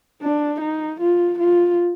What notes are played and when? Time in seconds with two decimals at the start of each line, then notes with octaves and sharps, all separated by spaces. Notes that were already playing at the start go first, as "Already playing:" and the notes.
0.22 D4
0.61 D#4
1.00 F4
1.39 F4